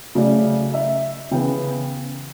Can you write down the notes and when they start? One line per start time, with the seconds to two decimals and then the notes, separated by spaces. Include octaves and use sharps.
0.15 C#3 F#3 A3 D5
0.74 E5
1.31 C#3 E3 B3 G5